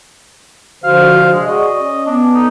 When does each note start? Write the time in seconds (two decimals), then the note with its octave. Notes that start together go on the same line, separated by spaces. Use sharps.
0.84 D3 F3 F#4 C5 F5
1.32 C3 G#3 D5
1.46 F#4 G#4 D#5
1.79 C#4
2.06 B3 D4
2.34 D#4 A4